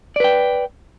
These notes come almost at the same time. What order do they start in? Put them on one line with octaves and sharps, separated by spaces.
D5 B4 G5